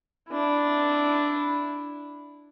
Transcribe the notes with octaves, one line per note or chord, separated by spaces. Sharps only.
D4 E4